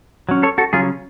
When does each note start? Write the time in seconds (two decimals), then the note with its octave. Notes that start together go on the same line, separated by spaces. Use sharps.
0.29 F#3 C#4
0.43 A4 C#5
0.58 F#4 A4
0.73 C#3 F#3 C#4 F4 G#4